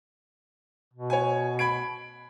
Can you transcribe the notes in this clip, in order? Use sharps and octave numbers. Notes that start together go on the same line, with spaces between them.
B2
C#5 G#5
B5 G#6 D7